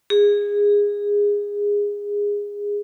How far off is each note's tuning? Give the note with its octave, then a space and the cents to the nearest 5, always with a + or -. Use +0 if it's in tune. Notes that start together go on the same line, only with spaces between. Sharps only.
G#4 -20